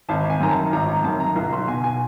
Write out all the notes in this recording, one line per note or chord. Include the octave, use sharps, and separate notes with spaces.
G#1 A5
G#5
F#2 D#3 A#5
A5
G#1 A#5
A#5
F#2 D#3 A5
A#5
B1 A#5
C6
B2 G#5
G#5